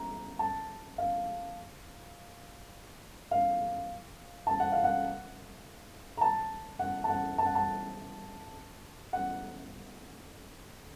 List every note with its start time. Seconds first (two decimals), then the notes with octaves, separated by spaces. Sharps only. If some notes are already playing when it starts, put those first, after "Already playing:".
Already playing: A#5
0.39 A5
0.98 F5
3.31 F5
4.47 A5
4.60 F#5
4.72 F5
4.84 F#5
6.17 A#5
6.21 A5
6.79 F#5
7.04 A5
7.10 F#5
7.38 A5
7.46 F#5
7.55 A5
9.13 F#5